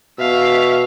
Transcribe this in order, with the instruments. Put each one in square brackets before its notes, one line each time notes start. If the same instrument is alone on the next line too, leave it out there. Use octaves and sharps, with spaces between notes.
[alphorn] B2 [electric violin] E5 F5